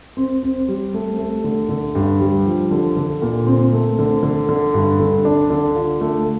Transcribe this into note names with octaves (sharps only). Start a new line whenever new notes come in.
C4
C4
G3
A3
A3
D3
D3
G2
G3
F3
D3
D3
A#2
C4
A3
D3
D3
D3
G2
D3
D4
D3
F4
A3